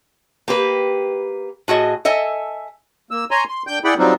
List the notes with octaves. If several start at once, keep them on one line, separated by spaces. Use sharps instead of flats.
A#3 G4 B4
A2 F#4 G#4 D#5
A4 D#5 E5 G#5
A#3 E6
C#5 G#5 A#5 C6
C6
D3 G5 G6
E4 G#4 D5 F#5 G5 B5
F#3 G3 C4 D4 D#4 F4